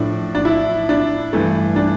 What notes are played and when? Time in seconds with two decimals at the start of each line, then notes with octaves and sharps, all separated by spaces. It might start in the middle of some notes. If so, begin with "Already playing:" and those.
Already playing: A2 F3 A3 D4
0.35 D4
0.45 E4
0.89 D4
1.33 G2 E3 A3
1.76 D4